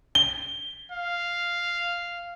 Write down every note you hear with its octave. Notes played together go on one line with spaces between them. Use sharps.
G7
F5